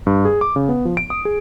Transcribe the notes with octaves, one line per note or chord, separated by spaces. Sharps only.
G2
G#4
D6
C#3
B3
F3
D7
D#6
G#4